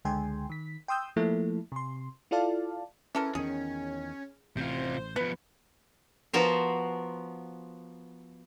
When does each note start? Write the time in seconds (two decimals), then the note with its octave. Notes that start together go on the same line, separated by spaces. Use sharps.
0.05 C#2 D3 G#3 G5 G#5 C6
0.50 D#3 B6
0.88 G5 C6 D#6 E6 G6
1.16 F3 A3 A#3 E4 A4
1.72 C3 C6
2.31 E4 F4 A4 D5 F5 A5
3.15 E3 C#4 A4 A#4
3.35 E2 D#3 C#4 G#4
4.57 A1 C3 F4 C5
5.16 F3 B3 B4
6.33 F3 B3 F#4 A#4 C5